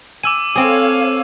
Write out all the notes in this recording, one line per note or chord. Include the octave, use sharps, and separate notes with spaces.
G#5 D6 E6 D#7
C4 G#4 A4 C#5 F5